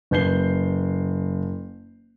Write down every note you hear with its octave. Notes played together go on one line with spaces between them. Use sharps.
F#1 B4 G6 C7 G7